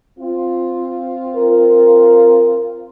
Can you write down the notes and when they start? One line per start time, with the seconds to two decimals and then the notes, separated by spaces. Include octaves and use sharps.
0.18 C4 F4
1.37 A#4